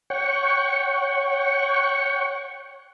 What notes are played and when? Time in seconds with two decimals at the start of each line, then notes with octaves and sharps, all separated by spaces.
0.10 C#5 F#5 G5 C#6